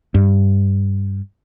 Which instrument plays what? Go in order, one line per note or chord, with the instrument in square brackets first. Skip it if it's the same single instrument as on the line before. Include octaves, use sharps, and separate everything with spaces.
[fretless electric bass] G2